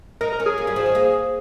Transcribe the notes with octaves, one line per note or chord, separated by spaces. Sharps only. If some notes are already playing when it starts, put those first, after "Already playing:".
D#4 A#4
A#4
C#4
G#4
A#3
G3
F3
D#3
A#3